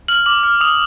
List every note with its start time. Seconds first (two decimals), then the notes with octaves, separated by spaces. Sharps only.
0.08 F6 F#7
0.26 D6 F#7
0.43 F6
0.61 D#6 F7